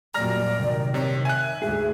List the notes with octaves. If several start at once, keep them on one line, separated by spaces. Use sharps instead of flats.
F#2 A#2 G3 D5 A#5 F6 A#6
C2 D#3
C3 C#5
E5 G#5 F#6
D2 G#2 G#4 E5